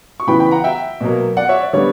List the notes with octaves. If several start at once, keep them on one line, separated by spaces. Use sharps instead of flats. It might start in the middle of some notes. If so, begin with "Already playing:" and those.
C#6
C#3 E3 B3 G5 B5
G5 B5
F#5 A#5
E5 G5
B2 F#3 A#3
D5 F#5
C#5 E5
D5
D3 G3 B3 C#5